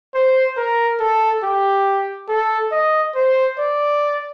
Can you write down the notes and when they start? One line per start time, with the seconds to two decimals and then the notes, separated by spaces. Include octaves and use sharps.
0.15 C5
0.57 A#4
1.00 A4
1.43 G4
2.29 A4
2.72 D#5
3.15 C5
3.59 D5